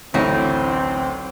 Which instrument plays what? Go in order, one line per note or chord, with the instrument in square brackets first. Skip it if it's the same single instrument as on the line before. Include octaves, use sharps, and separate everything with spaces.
[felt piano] A1 D2 [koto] F#3 D#4 [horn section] C4 [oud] E4